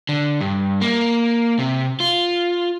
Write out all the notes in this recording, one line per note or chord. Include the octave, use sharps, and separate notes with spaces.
D3
G2
A#3
C3
F4